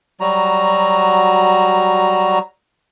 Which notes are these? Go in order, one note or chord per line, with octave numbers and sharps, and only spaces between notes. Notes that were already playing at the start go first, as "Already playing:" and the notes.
F#3 G3 F#4 A#5